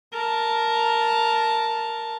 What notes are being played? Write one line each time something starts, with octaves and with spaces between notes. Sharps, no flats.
A#4 A5